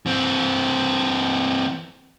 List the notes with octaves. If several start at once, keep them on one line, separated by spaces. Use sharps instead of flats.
E3 C4